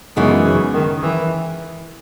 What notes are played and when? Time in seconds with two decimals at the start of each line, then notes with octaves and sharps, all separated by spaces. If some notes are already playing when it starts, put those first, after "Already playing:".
0.16 F#2 C#3 E3 G#3 B3 D#4
0.45 C#3
0.73 D#3
1.02 E3